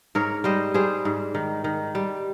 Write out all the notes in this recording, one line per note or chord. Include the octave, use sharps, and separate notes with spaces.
G#2 A#4 C#5
G3 C5 D#5
G3 G#4 C5
G#2
D#3
D#3
G3